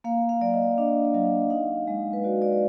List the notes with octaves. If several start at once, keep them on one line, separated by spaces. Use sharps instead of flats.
A#3 F5
F5
F#3 D5
D#5
D4 D#5
D#5
F#3 F5
D#4 F5
G#3 D#5
B4
F#4 D5
D5
D5